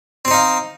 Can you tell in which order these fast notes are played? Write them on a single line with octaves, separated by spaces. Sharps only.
C4 C5 D#4 F5